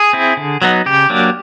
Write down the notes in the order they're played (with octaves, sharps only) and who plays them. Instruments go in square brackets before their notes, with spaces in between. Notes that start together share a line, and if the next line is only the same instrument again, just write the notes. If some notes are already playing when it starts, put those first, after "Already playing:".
Already playing: [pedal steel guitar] G#4
C4 E4
D3
F#3 B3 D#4
C#3 G4
F#3 A#3 D4